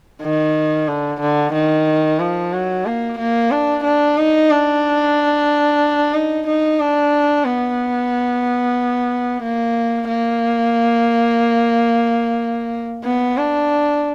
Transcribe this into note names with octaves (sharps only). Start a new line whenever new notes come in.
D#3
D3
D3
D#3
F3
F#3
A#3
A#3
D4
D4
D#4
D4
D#4
D#4
D4
B3
A#3
A#3
B3
D4